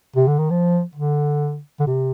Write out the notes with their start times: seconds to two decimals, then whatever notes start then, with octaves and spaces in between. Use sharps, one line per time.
0.16 C3
0.28 D3
0.39 D#3
0.50 F3
0.95 D3
1.80 D3
1.87 C3